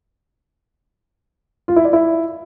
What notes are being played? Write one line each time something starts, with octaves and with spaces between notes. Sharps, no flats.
F4
E4
D5
E4